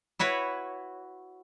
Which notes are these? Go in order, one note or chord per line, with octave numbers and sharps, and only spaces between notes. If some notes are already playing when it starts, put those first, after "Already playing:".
E4 F#4 B4 C#5